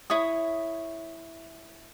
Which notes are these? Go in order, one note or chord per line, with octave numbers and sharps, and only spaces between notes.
E4 C#5 D#6